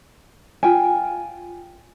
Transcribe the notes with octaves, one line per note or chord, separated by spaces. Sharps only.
F4 G5 G#5